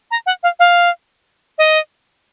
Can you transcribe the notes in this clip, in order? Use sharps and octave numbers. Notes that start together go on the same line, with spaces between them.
A#5
F#5
F5
F5
D#5